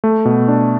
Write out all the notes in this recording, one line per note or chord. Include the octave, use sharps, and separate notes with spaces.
A3
B2
D4